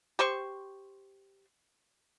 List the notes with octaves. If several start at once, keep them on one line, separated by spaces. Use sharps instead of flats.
G4 C5 C6 C#6